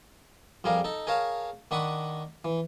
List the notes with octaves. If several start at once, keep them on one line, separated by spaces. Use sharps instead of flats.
F2 G3 G#4 A#4 F5
D#4 A4
G#4 A#4 C#5 F5 A5
D#3 D4 F#5 B5 C#6 D#6
E3